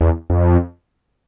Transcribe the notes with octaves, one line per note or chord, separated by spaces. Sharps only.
E2
F2